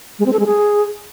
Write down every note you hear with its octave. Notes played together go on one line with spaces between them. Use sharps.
G#3
C4
A4
G#3
G#4